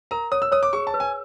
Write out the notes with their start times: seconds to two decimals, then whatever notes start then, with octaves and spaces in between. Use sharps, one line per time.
0.11 A#4 A#5
0.32 C#5 D#6
0.42 E6
0.52 C#5 D#6
0.63 D6
0.73 G#4 C#6
0.87 A5
0.94 B4
1.00 G#5